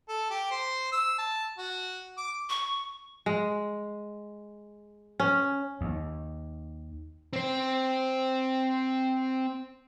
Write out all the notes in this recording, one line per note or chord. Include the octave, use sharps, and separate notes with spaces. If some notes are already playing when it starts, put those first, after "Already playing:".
A4
G4
C5
E6
A5
F#4
D6
C#6
G#3
C#4
D#2
C4 C5